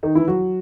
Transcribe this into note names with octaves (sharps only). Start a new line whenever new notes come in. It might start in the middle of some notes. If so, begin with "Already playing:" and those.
D#3 D#4
E3 E4
F#3 F#4